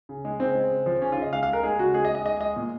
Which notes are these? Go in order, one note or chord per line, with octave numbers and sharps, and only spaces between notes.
C#3
G#3
C#3 C4
G#3
C#3
F3
C#3 C#4
F4
C#3 D#5
G#3 F5
F5
G#3 A#4
G#3 G#4
C#3 F#4
G#3 G#4
D#5
G#3
D#5
G#3 D#5
G#3 D#5
A#2